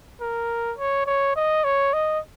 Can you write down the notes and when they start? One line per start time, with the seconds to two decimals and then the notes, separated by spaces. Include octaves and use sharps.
0.21 A#4
0.78 C#5
1.06 C#5
1.36 D#5
1.65 C#5
1.93 D#5